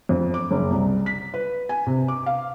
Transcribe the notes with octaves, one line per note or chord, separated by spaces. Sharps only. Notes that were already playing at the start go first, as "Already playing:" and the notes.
F2
D6
F#1
C2
B6
B4
G#5
C3
D6
F5